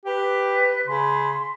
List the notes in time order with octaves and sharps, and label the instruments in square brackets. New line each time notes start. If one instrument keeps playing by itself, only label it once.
[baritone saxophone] G4 [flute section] B4
[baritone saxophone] C#3 [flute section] B5 C6